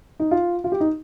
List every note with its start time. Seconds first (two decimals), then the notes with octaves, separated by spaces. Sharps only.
0.20 D#4
0.31 F4
0.64 F4
0.72 G4
0.81 D#4